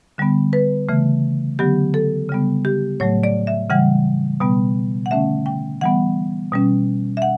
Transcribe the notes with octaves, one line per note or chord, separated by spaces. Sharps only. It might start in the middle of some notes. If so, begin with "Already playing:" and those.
D3 G3 B3
B4
C#3 E3 A3
D3 F#3 B3 G4
A4
C#3 G3 B3
G4
A2 F#3 A3 C#5
D5
E5
C#3 E3 G3 F#5
B2 G3 B3
F#5
D3 A3 C#4 E5
G5
E3 G3 B3 F#5
B2 G3 C#4
E5
F#5